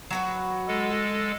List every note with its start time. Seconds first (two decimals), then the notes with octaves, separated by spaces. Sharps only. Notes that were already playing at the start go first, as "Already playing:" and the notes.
0.11 F#3 F#4 B4
0.68 G#3 A4